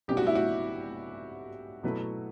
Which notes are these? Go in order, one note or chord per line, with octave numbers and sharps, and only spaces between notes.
B1 B2 G3 B3 D4 G4
F#4
E4
F#4
B2 F#3 A3 E4 B4